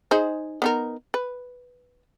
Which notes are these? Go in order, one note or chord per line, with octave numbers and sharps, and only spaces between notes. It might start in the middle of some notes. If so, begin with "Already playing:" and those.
D#4 G#4 C5
B3 D#4 A#4
B4